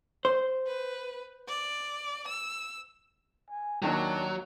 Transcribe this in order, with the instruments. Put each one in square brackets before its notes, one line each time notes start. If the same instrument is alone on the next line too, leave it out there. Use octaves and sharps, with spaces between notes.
[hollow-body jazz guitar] C5
[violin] B4
D5
E6
[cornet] G#5
[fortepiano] D#2 D#3 G5 [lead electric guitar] F#3 [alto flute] D4 [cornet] A#5